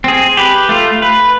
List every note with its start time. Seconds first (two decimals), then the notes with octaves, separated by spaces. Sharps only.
0.04 C4 G#4
0.37 G4 B4
0.69 A3 F4
1.02 B4